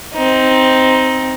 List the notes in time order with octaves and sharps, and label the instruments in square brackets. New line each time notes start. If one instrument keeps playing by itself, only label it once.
[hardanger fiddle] C4 D#4